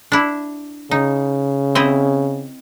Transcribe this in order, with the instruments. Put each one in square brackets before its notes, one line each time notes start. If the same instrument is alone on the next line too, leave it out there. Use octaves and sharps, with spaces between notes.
[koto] D4 E4
[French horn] C#3 [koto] D#4
[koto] C4 E4 D#5